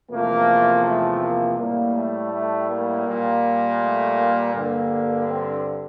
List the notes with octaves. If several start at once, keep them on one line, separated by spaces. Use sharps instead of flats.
E2 C3 F3 A3 A#3
A3
A#3
A2 G3 A#3
A3
A3
A#3
A#2 G3
A3
A#3
G2 D3 G3 A#3
C4